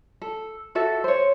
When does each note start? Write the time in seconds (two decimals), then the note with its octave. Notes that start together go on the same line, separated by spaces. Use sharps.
0.22 A4
0.75 F#4 A4 E5
1.04 C5 C#5